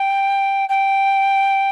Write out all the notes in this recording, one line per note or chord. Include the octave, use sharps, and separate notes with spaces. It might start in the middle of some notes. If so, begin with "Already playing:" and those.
Already playing: G5
G5